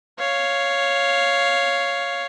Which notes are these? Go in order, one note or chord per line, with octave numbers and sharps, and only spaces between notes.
C#5 F5